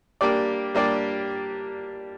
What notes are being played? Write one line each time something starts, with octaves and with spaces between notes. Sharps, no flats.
G3 A#3 D4 G4 D5
G3 A#3 D4 G4 D5